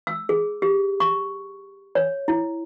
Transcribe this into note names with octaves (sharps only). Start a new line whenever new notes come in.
E6
G#4
G4
C#6
C#5
E4